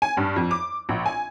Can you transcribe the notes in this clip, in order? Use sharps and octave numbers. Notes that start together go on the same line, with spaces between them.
G#5
G2
F2
D6
A#1
G#5